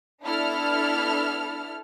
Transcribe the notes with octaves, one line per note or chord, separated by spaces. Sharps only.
B3 D4 E4 A4 F6